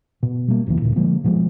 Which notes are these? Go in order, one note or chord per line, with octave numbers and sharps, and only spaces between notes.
B2
G3 A#3
F#1 C#2 C#3 E3
D2 A#2
D3 F3 G#3 A#3
B2 F3 G#3